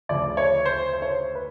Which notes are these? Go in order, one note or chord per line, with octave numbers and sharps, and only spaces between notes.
D2 C#3 F3 D5
C#5
C5
C5
C#5
C5
B4